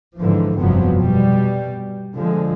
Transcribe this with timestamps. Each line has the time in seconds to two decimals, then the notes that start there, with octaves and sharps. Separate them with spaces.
0.17 G#2 D3 E3 F3
0.59 F1 G2 C3 F3 F#3 B3
0.96 B2 G3
2.16 D3 F3 G#3